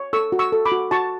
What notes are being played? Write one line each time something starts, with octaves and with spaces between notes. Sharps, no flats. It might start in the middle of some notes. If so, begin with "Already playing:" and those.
Already playing: C#5
A4 C#6 E6
F#4
C#6 E6
A4
B5 D6
F#4
F#4 A5 C#6